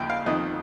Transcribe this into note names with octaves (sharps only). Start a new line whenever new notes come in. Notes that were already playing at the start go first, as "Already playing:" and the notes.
Already playing: D#2 C#3 F3 G5
F5
F2 D#3 D#5